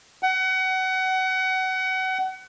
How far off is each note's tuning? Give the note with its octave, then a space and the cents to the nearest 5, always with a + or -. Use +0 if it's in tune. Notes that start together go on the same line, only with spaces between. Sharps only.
F#5 +25